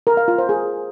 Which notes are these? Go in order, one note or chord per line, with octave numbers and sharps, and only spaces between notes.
A#4
F5
F4
C5
G#4